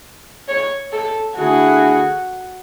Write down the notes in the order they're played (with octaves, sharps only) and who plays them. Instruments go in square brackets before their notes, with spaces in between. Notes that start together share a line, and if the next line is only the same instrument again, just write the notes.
[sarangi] C#5
A4
[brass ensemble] D3 A3 E4 G#4 [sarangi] F#4